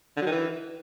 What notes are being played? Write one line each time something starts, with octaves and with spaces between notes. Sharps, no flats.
D3
F#3
D#3
E3